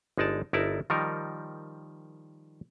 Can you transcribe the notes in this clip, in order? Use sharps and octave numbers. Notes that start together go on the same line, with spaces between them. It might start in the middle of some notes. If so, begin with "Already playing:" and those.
G1 G#3 D#4 D5 A5
G1 D#4 E4 A#4 D5 A5
D#3 F3 G3 D#4 A#4